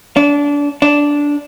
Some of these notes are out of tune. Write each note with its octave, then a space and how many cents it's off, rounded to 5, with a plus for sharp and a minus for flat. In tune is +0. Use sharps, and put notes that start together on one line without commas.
D4 -25
D4 -10